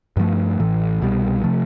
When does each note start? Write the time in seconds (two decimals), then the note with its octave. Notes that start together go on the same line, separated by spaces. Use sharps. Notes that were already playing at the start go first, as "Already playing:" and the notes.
0.17 G2 F3 A3
0.59 A1 A2 E3
1.02 C2 B2 G3
1.44 C3 F3 A3